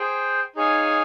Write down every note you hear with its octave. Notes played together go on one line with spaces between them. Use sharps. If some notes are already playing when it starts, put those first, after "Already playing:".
Already playing: G#4 C5 G5
D#4 G#4 C#5 F5 G#5